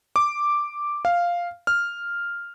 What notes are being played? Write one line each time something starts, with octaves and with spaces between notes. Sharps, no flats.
D6
F5
F6